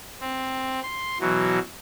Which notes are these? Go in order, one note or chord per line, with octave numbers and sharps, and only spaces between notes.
C4
C6
B2 E3 F#3